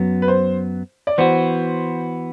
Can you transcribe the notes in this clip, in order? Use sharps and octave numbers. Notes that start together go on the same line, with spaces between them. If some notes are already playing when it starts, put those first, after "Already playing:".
Already playing: F#2 F#3 B3
B4
C5
D5
E3 B3 F#4 C5